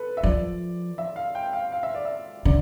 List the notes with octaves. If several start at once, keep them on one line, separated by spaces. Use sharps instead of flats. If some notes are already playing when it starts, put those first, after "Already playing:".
Already playing: A4 B4
E5
F3 D5
E5
F5
G5
F5
F5
E5
D5
E5
D3 D5